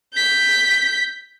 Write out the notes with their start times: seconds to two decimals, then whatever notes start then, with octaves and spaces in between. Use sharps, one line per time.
0.14 G6 B6